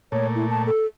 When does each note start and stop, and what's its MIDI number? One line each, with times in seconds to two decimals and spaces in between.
0.12 0.71 46
0.12 0.71 57
0.12 0.27 73
0.35 0.46 64
0.49 0.62 81
0.66 0.86 69